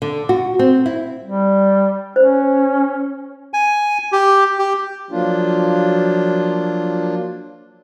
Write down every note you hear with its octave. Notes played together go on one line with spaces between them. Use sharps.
D3
F#4
C4
E4
G3
C#4 C5
G#5
G4
G4
F3 F#3 A#3 D4 F4